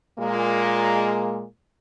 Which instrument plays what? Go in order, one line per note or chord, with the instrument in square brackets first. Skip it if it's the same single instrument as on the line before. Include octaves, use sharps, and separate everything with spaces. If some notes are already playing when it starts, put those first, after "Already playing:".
[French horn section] A#2 G#3 A#3